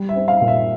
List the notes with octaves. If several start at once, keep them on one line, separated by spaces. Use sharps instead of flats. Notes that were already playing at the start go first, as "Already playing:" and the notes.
Already playing: G3
E5
C4
F5
A#2
E5